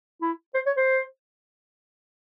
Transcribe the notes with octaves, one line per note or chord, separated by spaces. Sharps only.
E4
C5
C#5
C5